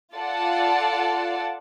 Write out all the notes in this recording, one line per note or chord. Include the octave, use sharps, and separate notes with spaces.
F4 A4 D5 F#5 A5